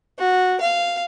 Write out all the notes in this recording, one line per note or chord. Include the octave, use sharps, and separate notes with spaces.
F#4
F5